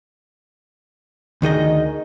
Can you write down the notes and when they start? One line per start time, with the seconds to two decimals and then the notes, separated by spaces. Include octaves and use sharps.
1.42 D2 D#3 G#4 D#5